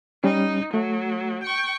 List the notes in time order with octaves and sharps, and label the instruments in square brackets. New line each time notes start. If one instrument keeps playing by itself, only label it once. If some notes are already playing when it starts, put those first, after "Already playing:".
[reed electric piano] G3 C#4 [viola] D#4
[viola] F#3 [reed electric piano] A3
[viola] G5 C#6